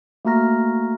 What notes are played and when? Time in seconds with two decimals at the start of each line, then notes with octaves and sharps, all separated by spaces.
0.25 A3 A#3 F#4 A#5 F6 A#6